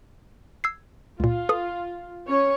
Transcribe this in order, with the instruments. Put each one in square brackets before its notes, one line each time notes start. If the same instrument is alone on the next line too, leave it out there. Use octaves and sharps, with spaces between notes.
[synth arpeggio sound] E6 G#6 C7
[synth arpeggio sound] C#2 A#2 [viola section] F4
[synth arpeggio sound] A4 B4 D#6
[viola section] C#4 C#5